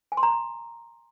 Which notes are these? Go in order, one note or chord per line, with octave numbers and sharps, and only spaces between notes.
G#5
C6
A#5